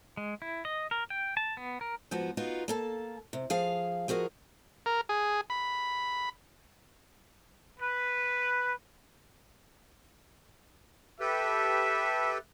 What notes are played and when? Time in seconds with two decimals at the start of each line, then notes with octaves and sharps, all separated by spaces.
0.17 G#3
0.42 E4
0.65 D#5
0.91 A#4
1.10 G5
1.37 A5
1.57 B3
1.81 A#4
2.11 G#2 F3 B3 F#4
2.37 B3 D#4 F4 F#4
2.68 A#3 A4 A5
3.33 C3
3.50 F3 G#4 F5
4.08 F3 F#4 G#4 A#4 D#5
4.86 A#4
5.09 G#4
5.50 B5
7.80 B4
11.20 G4 A4 B4 E5